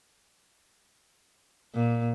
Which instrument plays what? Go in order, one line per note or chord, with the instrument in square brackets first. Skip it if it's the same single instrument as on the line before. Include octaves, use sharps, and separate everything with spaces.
[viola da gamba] A#2